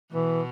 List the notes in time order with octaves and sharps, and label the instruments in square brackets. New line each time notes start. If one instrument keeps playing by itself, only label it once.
[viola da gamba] B2 [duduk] E3